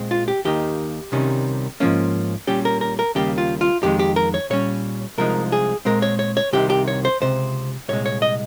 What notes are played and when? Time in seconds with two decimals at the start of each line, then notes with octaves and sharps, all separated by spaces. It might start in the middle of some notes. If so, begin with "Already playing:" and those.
Already playing: A#2 G#3 C4
0.11 F4
0.28 G4
0.45 D#2 D#3 A#3 D#4 G4
1.12 C2 C3 D#3 G3 C#4
1.80 G#2 F3 A#3 C#4
2.47 A#2 G3 C#4 G4
2.65 A#4
2.81 A#4
2.99 A#4
3.15 D#2 C#3 G3 A#3 G4
3.38 F4
3.61 F4
3.83 F2 D#3 G#3 G4
3.99 G4
4.16 A#4
4.34 C#5
4.50 A#2 G3 C#4 C#5
5.18 C2 C3 F3 G#3 D#4 A#4
5.52 G#4
5.85 A#2 G#3 C4 A#4
6.02 C#5
6.19 C#5
6.37 C#5
6.53 C2 C3 D#3 G4
6.70 G4
6.88 C#5
7.05 C5
7.20 C#2 C3 C5
7.88 C2 A#2 G#3 C#5
8.06 C#5
8.22 D#5